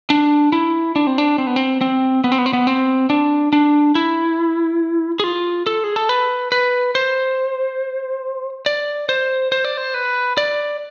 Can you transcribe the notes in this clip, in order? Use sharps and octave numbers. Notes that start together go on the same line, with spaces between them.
D4
E4
D4
C4
D4
C4
B3
C4
C4
B3
C4
B3
C4
B3
C4
D4
D4
E4
G#4
F4
A4
G#4
A4
B4
B4
C5
D5
C5
C5
D5
C5
B4
D5